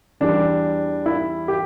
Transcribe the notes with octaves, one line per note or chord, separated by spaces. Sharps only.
E2 E3 G3 D4
E4
G4